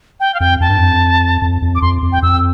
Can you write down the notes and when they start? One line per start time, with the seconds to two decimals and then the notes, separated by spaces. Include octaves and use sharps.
0.20 G5
0.34 F5
0.40 F2 G5
0.60 F2 A5
0.69 G2
0.78 F2
1.42 F2
1.62 F2
1.75 D6
1.82 F2 C6
2.02 F2
2.12 G5
2.22 F2 E6